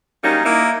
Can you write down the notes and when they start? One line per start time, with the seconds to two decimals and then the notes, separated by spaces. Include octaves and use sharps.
0.24 F#3 G3 A#3 C#4 D#4
0.45 A#3 D#4 E4